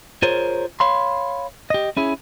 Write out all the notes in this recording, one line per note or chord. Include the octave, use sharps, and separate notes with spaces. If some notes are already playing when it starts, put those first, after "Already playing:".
F4 G#4 A#4 C5 C#5
C#5 F5 B5 C6
G4 D#5
C#4 E4 G#4